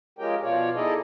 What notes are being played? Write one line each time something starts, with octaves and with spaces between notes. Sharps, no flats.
F3 G#3 C#4 G4 A#4 G5
B2 F3 F4 C#5 D5
D#4 E4 G#4 A4 D5 D#5